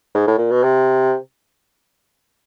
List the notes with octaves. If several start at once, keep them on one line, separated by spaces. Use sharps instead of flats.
G#2
A2
A#2
B2
C3